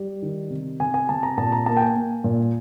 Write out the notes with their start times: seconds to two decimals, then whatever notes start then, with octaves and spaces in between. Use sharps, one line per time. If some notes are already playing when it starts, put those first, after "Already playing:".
Already playing: G3
0.22 D#3
0.50 C3
0.80 C3 G#5
0.94 G#5
1.09 C3 A5
1.23 A#5
1.37 A#2 A5
1.52 A#5
1.66 A#3 A5
1.77 G5
1.82 G#5
1.96 A#3
2.24 A#2